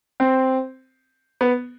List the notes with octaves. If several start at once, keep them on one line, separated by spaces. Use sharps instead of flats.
C4
B3